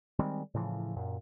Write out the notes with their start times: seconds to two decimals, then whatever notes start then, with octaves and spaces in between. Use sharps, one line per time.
0.19 D#3 G3 G#3 C4
0.54 A2 C#3 E3 F3
0.96 F#2 A#2